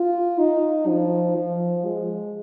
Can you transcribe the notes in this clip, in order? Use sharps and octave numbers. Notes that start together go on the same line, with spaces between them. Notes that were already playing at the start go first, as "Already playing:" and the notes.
Already playing: F4
D#4
F3
F3
G#3